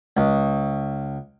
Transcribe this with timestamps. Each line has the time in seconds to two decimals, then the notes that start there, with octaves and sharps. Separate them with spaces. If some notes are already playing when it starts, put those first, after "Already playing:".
0.17 C#2